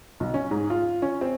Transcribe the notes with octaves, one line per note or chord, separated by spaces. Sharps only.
B1
C#4
G#2
F4
C#4
C4